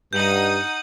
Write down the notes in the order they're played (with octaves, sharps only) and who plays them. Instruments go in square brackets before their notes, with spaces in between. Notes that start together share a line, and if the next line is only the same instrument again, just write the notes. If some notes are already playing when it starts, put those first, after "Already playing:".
[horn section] G2 [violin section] D#4 F#5 D#6 [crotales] G6 F#7